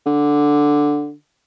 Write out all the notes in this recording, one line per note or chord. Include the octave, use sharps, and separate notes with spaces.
D3